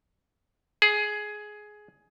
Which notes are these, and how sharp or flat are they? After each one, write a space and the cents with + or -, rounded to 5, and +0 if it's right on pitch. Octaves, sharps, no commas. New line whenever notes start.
G#4 +10